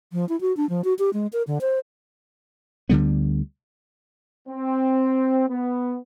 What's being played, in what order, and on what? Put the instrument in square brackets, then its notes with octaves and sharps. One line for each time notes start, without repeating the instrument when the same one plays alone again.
[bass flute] F3
E4
F#4
D4
F3
F#4
G4
G#3
A#4
D3
C5
[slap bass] D2 D3 G3 B3
[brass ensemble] C4
B3